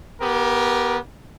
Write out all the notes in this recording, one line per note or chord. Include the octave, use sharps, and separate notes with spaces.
B3 G4 A#4